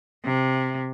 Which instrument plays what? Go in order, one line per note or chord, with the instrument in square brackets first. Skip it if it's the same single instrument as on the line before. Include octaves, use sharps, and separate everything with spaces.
[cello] C3